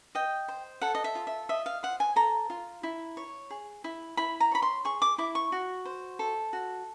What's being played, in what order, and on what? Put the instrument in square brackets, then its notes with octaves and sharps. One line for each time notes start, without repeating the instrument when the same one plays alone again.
[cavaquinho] D#5 G5
C5
A4 F#5
D#5
E5
F4
E5
D#5 E5
F5
C5 F#5
G#5
A4 A#5
F4
E4
C#5
G#4
E4
E4 B5
A#5
C#5 B5
C6
G#4 C#6
D6
E4 D6
C#6
F#4
C5
A4
F#4